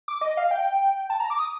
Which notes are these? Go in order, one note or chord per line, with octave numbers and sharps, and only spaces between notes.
D6
D#5
F5
G5
A5
A#5
D6
D#6